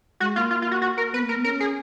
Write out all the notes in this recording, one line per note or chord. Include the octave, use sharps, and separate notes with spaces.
G#3 F#4
A#3 F4
F4
F4
F#4
F#4
A#4
B3 B4
A#3
A#4
B3
C#4 A#4
G#4